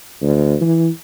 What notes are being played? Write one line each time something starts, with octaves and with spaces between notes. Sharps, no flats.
D2
E3